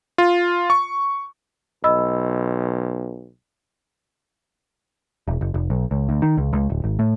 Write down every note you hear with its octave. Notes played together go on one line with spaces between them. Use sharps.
F4
C#6
B1 D#5 B5 E6
E1
F#1
F1
B1
C#2
D2
D#3
C#2
C#2
D1
G#1
A2